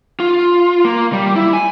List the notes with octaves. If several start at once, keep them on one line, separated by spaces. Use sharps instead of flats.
F4
A#3
G3
E4
G#5